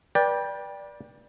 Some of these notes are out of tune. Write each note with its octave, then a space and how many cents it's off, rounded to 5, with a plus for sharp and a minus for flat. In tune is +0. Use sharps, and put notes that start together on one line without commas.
B4 -30 D5 +0 G5 +15